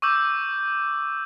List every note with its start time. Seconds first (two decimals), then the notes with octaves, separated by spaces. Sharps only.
0.02 C#6 D6 E6 G6